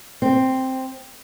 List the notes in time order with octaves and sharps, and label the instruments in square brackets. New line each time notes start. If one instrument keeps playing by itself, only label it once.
[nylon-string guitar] C4